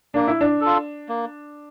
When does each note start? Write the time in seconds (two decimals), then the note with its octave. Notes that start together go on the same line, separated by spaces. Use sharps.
0.14 A#3 D4
0.28 E4
0.41 D4
0.61 F4 A4
1.09 A#3